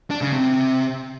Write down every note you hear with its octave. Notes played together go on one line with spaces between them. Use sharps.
D4
C#3
C3